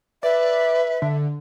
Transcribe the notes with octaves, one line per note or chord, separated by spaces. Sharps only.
B4 D5 E5
D3